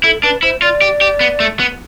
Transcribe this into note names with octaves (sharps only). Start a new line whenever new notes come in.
E4 A4
D4 B4
E4 C5
F4 D5
G4
G4
B3
A3
B3